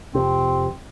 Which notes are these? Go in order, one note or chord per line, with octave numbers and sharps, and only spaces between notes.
F2 C3 C4